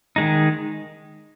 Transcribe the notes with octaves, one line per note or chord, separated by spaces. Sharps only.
D#3 G#3 D#4